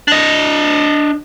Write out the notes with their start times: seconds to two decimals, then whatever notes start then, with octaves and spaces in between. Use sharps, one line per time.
0.08 D4 D#5